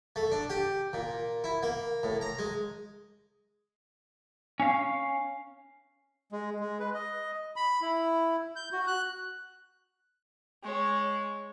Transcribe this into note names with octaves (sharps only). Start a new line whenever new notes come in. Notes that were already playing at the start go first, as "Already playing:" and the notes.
A3
D4
G4
A#2
E4
A#3
A2
A#5
G#3
C#4 F5
G#3
G#3
B4
D#5
B5
E4
G6
F#4
F#6
G#3 C#5